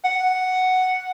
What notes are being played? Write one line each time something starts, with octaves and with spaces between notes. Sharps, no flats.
F#5